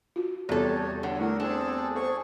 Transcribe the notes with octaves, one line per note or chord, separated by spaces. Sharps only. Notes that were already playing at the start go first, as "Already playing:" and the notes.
F4 F#4
E2 C3 G3 G4 A4 C#5
D3 A4 C#5 F#5
A3 E4 A#4
C4 D4 G#4 A4
G#4 A4 C5 C#6